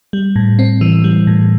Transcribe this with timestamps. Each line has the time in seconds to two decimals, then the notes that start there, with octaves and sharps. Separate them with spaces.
0.13 G3
0.36 A2
0.59 C4
0.81 E3
1.04 G3
1.27 A2